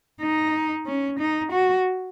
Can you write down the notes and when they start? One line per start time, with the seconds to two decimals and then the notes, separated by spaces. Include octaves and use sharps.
0.21 D#4
0.86 C#4
1.19 D#4
1.52 F#4